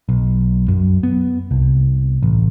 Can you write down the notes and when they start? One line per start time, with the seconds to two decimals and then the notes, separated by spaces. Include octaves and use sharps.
0.09 B1
0.68 F#2
1.03 B3
1.51 C2
2.23 A1